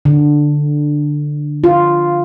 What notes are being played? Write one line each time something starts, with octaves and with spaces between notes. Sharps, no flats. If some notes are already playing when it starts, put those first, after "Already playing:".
D3
F4